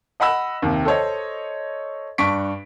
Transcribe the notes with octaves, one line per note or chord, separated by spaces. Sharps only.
D#5 F#5 B5 E6
D#2 C3
A4 C5 C#5 D#5
G2 D4 C#6 B6 D7